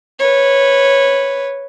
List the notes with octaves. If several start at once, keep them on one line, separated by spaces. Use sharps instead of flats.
B4 C#5